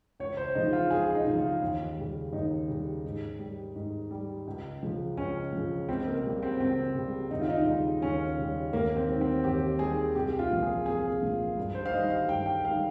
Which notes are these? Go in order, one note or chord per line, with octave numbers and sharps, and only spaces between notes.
C#2 C#5
C5
C#3 F3 D#4
F4
C#2 G#4
D#4
C#3 F3
F4
D#2
C#3 G3
D#2 D#4
C#3 G3
G#2
G3
G#2
G3
C#2
C#3 F3
C#2 C#4
C#3 F3
C#2 C4
A#3
C#3 G3
C4
C#2 C4
C#3 G3
D#2 D#4
F4
D#4
C#3 G3 D#4
D#2 C#4
C#3 G3
D#2 A#3
C4
D#3 G3
C4
D#2 G4
D#3 G3 G#4
C2 G4
F4
A#2 F3
G#4
C2 G#4
A#2 F3
G2
C5
F5
D#3 G3 D#5
F5
G2 G5
G5
D#3 F5
G3